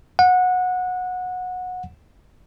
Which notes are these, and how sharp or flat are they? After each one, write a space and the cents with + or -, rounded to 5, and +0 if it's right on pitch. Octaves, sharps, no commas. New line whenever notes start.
F#5 -20